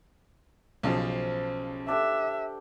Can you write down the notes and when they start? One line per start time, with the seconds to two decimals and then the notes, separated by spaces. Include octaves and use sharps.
0.83 B1 C#3 F3 C5 F5 A5
1.88 D4 G4 A4 E5